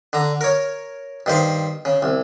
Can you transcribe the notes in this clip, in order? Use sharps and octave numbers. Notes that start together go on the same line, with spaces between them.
D3 A#5
A#4 C#5
G2 D#3 C5
C#3
C2